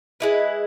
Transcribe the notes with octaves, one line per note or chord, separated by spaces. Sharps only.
G#3 E4 B4